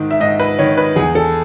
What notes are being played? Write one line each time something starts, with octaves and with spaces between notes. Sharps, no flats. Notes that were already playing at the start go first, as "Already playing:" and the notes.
Already playing: G#2 D#3
E5
G#2 D#5
B4
D#3 C#5
B4
E2 G#4
A4